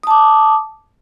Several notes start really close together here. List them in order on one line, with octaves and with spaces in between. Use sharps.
D#6 A5 D6